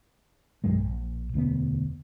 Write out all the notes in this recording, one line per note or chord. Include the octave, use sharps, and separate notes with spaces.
B1 G2 F#3 G#3
A#1
E1 D2 A#3 B3